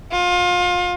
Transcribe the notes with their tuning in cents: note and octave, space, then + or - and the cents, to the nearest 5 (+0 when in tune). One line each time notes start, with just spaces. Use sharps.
F4 +30